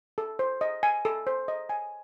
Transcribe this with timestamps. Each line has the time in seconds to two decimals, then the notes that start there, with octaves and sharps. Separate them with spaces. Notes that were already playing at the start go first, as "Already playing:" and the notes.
0.18 A4
0.39 C5
0.61 D#5
0.83 G#5
1.05 A4
1.27 C5
1.48 D#5
1.69 G#5